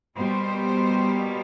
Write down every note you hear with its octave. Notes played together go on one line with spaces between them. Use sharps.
B2 G3 A#3 C5